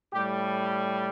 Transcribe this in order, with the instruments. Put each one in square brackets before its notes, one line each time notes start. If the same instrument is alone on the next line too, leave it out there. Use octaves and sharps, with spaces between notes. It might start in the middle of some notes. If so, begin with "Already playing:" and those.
[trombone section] A2 G3 G4